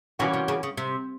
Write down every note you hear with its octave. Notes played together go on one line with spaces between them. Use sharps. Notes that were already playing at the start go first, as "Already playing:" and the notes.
B2 E3 G3 A#3 C#4 F#4
C3
C#3
C#3
C3